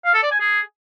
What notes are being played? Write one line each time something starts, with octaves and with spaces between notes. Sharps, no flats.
F5
A4
D5
G#5
G#4